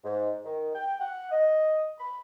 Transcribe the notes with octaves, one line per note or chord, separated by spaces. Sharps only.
G#2
D#3
G5
F#5
D#5
B5